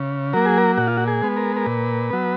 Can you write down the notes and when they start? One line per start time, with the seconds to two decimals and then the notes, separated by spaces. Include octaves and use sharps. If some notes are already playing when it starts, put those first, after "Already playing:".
Already playing: C#3
0.33 F#3 A#3 A#4
0.46 G#4
0.58 A#4
0.78 A#2 F#4
0.87 F4
0.97 F#4
1.07 G#4
1.22 G#3 B3
1.37 A#4
1.56 A#4
1.66 A#2 B4
2.10 F#3 B3